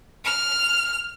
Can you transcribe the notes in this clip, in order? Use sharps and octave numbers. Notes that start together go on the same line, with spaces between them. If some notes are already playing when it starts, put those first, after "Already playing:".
F6